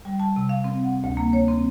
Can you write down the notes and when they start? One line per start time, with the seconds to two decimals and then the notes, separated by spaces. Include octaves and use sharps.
0.05 G3
0.20 A5
0.36 C3
0.49 F5
0.64 C4
0.84 F#5
1.04 D2
1.17 A#3
1.33 C#5
1.48 C4